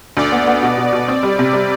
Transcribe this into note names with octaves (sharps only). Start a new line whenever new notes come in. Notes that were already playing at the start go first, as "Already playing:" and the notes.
D2 D5
B3
B3
B2
B2
B2
C4
G3
C3
G3